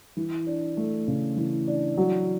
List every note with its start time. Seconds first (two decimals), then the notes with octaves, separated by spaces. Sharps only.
0.17 E3
0.47 D4
0.77 A3
1.08 C#3
1.37 E3
1.68 D4
1.97 F#3